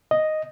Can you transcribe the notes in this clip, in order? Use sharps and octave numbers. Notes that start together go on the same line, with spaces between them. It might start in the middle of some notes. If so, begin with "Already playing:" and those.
D#5